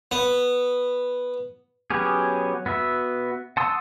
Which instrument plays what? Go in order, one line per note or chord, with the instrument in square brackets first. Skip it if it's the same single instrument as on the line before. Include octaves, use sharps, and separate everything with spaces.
[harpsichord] B3
[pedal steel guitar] F#3 B3 C#4 G4 G#4
B3 F#4 E5
F#5 A5 C6 D#6 E6